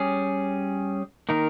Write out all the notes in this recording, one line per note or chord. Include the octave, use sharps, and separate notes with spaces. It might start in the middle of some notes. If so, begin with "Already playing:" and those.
Already playing: G3 C#4 G#4
D#3 A#3 D#4 A#4